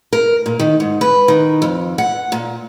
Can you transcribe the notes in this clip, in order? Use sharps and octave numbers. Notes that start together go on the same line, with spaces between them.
A#4
A#2
D#3
G#2
B4
D#3
F2
F#5
A#2